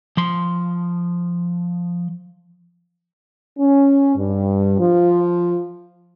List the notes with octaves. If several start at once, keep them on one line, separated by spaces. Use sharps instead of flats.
F3 C6
C#4
G2
F3